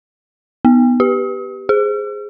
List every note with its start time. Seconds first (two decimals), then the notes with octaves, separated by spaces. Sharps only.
0.65 B3
1.00 G4
1.69 G#4